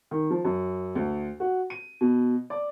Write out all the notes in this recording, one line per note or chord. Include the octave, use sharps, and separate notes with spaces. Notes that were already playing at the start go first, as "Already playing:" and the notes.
D#3
F3
F#2
D2
F#4
D#7
B2
D5